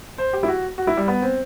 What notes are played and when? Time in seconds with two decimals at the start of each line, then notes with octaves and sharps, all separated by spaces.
0.18 C5
0.33 G4
0.43 E4
0.48 F#4
0.78 F#4
0.87 E4
0.97 G3
1.08 B3
1.22 C4